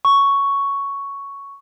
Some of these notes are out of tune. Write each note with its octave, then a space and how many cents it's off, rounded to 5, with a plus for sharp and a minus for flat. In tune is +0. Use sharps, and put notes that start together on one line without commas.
C#6 +5